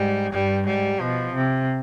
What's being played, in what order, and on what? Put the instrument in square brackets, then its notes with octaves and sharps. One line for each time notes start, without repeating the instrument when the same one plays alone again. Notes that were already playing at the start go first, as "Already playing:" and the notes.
Already playing: [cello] G#2 [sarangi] G3
[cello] G2 [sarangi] G3
[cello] G#2 [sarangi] G3
[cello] B2 [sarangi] F3
[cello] C3